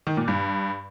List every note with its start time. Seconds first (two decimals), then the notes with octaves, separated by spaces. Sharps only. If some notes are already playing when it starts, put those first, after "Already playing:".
0.07 D#3
0.17 A#2
0.28 G2